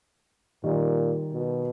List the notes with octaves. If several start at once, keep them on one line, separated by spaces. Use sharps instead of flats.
A#2 D#3 G3
B2